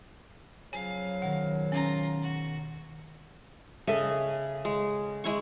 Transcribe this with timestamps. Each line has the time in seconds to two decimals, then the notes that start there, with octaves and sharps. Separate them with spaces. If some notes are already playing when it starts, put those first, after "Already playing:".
0.73 C#3 F3 F#3 F5 G#5
1.22 B2 D#3 A#4 F#5
1.72 C#4 F4 A#5
2.22 F#4
3.87 C#3 A4 D#5 E5 G#5
4.65 G#3
5.24 G#3 E4 C#6